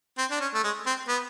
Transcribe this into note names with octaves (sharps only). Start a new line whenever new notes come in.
C4
D4
C#4
A3
G#3
C4
B3